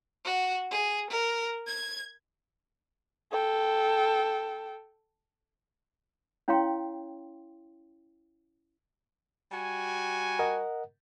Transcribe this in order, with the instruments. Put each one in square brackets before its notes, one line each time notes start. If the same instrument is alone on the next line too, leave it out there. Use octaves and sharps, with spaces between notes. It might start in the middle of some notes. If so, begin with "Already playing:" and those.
[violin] F#4
G#4
A#4
G#6
[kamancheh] A4 G5
[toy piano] C#4 E4 C#5 F5 G5 C6
[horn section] G3 F#4 G#5
[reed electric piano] A#4 D#5 F#5